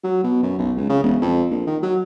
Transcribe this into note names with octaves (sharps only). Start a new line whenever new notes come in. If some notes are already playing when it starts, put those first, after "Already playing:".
F#3
B2
F#2
B1
C#2
C#3
E1
F2
A#1
D#3
F#3